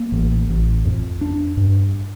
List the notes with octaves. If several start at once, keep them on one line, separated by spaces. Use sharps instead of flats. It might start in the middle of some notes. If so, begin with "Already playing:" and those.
Already playing: A#3
A1
A1
F2
D4
G2